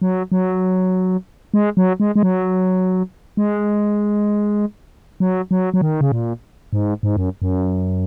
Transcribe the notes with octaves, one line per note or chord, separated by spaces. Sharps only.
F#3
F#3
G#3
F#3
G#3
G#3
F#3
G#3
F#3
F#3
F#3
D#3
C#3
A#2
G#2
G#2
F#2
F#2